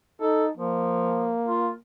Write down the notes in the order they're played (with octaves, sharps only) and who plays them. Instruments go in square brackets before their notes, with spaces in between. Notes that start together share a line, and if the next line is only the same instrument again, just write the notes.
[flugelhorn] D#4 [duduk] A4
[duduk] F3 [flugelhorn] A#3
[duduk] F4